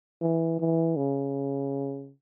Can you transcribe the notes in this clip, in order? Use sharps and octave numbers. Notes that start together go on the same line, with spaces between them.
E3
E3
C#3